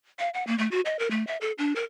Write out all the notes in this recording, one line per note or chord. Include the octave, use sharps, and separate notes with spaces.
F5
F#5
A#3
A3
F#4
D#5
A#4
A3
E5
A4
D4
A#4